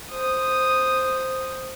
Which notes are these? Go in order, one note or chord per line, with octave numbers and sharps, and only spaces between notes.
C5 D#6